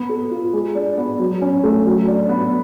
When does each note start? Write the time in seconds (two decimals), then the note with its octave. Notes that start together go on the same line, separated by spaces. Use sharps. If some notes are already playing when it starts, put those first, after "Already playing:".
Already playing: B3
0.09 A4
0.31 F4
0.53 G#3
0.75 D4
0.97 B3
1.19 F#3
1.42 C#4
1.64 A3
1.85 F#3
2.07 D4
2.29 B3